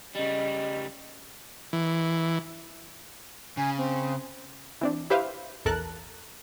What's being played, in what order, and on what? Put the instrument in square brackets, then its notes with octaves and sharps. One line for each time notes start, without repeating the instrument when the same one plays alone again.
[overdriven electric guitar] C#3 G3 [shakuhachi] D#5
[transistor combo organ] E3
[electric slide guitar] C#3 [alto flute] G#5
[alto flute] C4
[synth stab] E3 C4 D4
E4 G4 B4 C5 E5 F5
A#1 E2 A4 A#4 A5 F#6